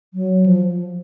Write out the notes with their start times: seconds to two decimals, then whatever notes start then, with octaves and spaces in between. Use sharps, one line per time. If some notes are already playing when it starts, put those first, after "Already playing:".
0.14 F#3
0.46 F3